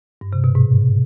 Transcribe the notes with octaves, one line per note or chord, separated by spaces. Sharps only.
G2
C3
B2
G#2